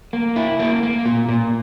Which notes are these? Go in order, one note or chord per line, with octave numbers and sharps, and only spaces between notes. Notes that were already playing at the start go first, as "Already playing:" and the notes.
A#3
E4
A#3
A#3
A#2
A#2